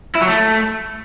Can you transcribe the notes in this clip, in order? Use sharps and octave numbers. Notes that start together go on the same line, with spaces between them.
E4
F#3
A3